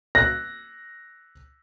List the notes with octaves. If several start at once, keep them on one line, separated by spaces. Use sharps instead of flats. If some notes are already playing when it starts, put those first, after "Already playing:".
F#6 A#6